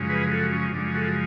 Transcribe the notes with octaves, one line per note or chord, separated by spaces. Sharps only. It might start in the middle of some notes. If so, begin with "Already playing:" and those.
Already playing: F#2 C#3 F3 G#3
G#4 B4
F#4 A4
C#4
F#2 C#3 F3 G#3 D4
F#4 A4